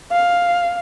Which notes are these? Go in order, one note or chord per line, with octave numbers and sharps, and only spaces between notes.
F5